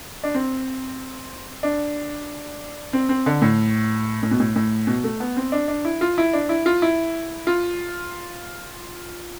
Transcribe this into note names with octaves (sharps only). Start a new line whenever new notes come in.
D4
C4
D4
C4
C4
D3
A2
A2
B2
A2
A2
B2
A3
B3
C4
D4
D4
E4
F4
E4
D4
E4
F4
E4
F4